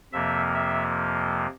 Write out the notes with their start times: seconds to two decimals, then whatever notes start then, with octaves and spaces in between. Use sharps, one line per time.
0.13 F2 C3 F3 A#3 E5
0.54 E5